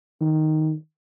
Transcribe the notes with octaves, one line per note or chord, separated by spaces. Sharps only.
D#3